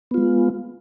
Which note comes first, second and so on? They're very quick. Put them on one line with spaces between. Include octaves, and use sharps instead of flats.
B3 F4 G#3